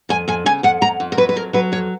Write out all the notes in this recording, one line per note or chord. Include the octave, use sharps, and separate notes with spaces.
F2 G#5
F2 G#5
C#3 G#5
F2 F#5
F2 A#5
F2
A#4
F#3 B4
B4
F2 A#4
F#3 B4
F2 C#5